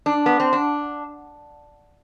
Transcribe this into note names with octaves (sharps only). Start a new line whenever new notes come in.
D4
B3
C4
D4